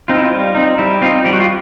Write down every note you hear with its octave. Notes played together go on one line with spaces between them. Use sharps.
C4 D#4 F4
E4
F4
G3
C4 D#4
G3 E4
C4 D#4 F4
G3 G4
F#4
F4